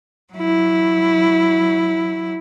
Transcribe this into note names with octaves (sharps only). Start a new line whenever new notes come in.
F#3 E4